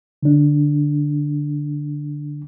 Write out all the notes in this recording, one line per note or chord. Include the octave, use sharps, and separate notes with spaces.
D3 D4